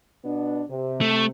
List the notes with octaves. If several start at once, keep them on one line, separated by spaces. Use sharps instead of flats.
B2 B3 D4
C3
A3